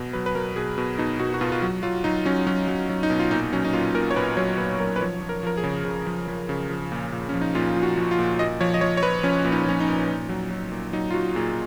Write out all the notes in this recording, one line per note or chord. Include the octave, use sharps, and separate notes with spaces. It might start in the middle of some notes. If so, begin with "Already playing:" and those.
Already playing: B2
F#3 B4
B4
F#3 A#4
B2 G#4
B2
B2 D#4
B2 F#4
F#4
B2 F4
F4
F#3 F#4
F#3 F4
F#3 D#4
F#3 C#4
F#3 C#4
F#3
F#3
D#4
B2
F4
A#2 D#4
F#3 C#4
D#4
A#2 F4
A#2 A#4
C#5
A#2 B4
F#3 C#5
A#2 B4
F#3 A#4
B4
F3 C#5
F3
A#4
F3 A#4
G#4
C#3
C#3
F3
F3
C#3
F3
A#2
A#2
F3 C#4
D#4
A#2 F4
F3
F#4
F3
F4
A#2
A#2 D#5
F3 C#5
D#5
F3 C#5
C#5
F3 B4
F3 C#4
A#2
D#4
F3 C#4
D#4
A#2
A#2
F#3
F#3
A#2
F#3 D#4
F4
F#3 F#4
A#2 G#4